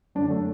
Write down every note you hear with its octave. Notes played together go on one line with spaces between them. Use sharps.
F#2 D3 D4
A3